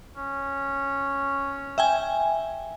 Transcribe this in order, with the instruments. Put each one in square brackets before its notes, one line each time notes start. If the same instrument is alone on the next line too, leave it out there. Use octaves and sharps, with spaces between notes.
[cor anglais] C#4
[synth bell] E5 G5 G#5